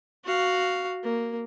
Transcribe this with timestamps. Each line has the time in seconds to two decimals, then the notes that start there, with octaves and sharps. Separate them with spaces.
0.24 F#4 F5
1.04 A#3